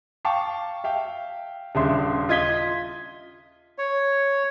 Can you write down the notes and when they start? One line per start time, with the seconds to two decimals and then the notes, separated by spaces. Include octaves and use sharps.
0.25 F5 G5 A5 C#6 D6
0.84 E5 F5 G5
1.75 D#1 C#3 D4 E5 C6
2.29 F4 D#5 G#6 B6 G7
3.78 C#5